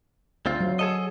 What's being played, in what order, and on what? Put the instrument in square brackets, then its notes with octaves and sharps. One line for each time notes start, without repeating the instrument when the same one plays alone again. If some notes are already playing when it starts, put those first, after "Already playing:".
[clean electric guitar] D2 C4 F4
[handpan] F#3
[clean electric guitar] G#4 A4 D#5